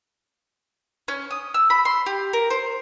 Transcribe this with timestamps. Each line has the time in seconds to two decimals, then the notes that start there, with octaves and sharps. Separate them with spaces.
1.08 C#4
1.31 D#6
1.54 E6
1.70 B5
1.85 C6
2.06 G4
2.33 A#4
2.50 C5